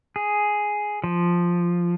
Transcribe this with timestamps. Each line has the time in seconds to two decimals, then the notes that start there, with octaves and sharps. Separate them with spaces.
0.16 G#4
1.04 F3